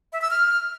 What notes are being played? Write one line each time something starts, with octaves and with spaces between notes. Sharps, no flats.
E5
E6
F6